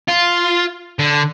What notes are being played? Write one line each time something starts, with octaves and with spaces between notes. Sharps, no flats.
F4
D3